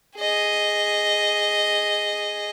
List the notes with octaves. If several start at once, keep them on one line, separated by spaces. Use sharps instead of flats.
G#4 D#5